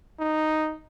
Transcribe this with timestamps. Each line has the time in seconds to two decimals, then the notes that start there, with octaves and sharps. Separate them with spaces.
0.19 D#4